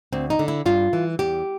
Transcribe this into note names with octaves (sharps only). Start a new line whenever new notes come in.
D2 C4
D#4
D3
E4
G2 F4
E3
E2 G4